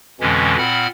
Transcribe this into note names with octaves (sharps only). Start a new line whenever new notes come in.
F2 B2 D3 E3 G#3 C#4
A#2 C4 F#5 B5 F6